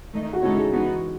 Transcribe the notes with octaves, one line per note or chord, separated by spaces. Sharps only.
D#3 A3 D#4
F#4
C#3 G#3 D#4 E4 A4 C#5
G#4
E3 G#3 B3 D#4 F#4